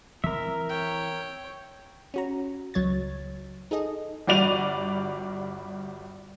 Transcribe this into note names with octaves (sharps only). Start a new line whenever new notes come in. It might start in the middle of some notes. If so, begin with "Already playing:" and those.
E3 C4 A#4 E5
C#5 G5
C#4 F#4 A#5
C#2 F#3 C#5 G#6 A6
D#4 G#4 A4 D#5
G1 G3 F#4 D5 D#7 F7